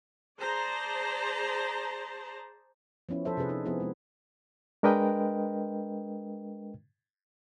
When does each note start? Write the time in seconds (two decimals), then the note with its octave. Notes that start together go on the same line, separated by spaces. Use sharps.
0.40 G#4 C5 D5 A5 A#5
3.09 F3 B3 C#4 E4
3.25 F3 A4 C5 E5
3.37 C3 C#4 G#4 B4
3.49 D#4 B4
3.65 F3 B3 C4 E4 G#4
3.80 G#3 B3
4.83 G#3 D4 A#4 B4 D#5 G5